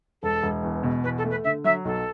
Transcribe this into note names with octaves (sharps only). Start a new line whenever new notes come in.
E1 A4
E1
E2
B2
E2 B4
A4
A3
B4
D3 E5
F#3 E5
B1 A4